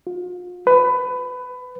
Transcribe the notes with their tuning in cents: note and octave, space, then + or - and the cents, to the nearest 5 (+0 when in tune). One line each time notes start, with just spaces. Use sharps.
F4 +40
B4 +20